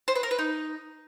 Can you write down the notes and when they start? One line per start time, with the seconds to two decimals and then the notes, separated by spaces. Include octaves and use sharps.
0.08 C5
0.15 B4
0.23 A#4
0.31 B4
0.39 D#4